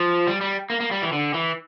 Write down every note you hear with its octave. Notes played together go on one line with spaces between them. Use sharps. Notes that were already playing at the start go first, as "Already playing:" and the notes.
Already playing: F3
G3
G3
A#3
A#3
G3
E3
D3
E3